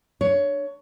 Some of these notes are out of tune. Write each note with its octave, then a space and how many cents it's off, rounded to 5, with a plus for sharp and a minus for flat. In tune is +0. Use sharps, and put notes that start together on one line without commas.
D4 +15 C#5 +15